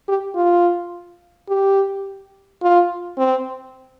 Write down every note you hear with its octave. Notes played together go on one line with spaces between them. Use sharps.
G4
F4
G4
F4
C4